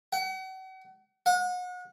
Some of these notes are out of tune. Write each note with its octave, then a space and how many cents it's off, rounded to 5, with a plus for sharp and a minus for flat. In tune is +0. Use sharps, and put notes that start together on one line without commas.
F#5 +40
F#5 -35